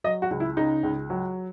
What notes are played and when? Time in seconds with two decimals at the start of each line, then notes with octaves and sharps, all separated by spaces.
0.04 F#3 D#5
0.22 F#4
0.31 C#2
0.40 E4
0.57 C#3 D#4
0.83 C#2
1.10 F#3